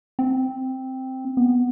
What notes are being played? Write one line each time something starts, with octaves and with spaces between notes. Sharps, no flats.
C4
B3